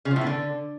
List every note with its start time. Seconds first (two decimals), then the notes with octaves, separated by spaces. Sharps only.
0.05 C#3
0.11 F3
0.16 A2
0.21 B3
0.27 D3